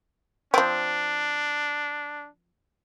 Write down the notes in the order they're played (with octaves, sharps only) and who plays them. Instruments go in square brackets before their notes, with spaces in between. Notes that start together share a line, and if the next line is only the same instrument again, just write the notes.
[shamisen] F3 C4 [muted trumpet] D4